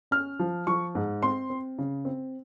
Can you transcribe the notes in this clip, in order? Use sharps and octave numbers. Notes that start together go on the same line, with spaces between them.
C#4 F6
F3
F3 C#6
G#2
C4 C6
C4
C#3
C4